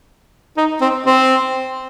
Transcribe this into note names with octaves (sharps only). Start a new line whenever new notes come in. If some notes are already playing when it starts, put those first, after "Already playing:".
D#4
C4
C4